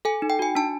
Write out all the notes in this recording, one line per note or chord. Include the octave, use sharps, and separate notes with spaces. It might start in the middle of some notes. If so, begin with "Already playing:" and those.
A4 G#5
D#4
G5
F#4 G#5
D4 A5